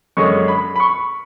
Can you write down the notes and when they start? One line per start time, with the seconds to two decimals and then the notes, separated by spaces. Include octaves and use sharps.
0.17 F#2 D3 G#3 C#4 C#6
0.48 B5
0.76 B5
0.80 C#6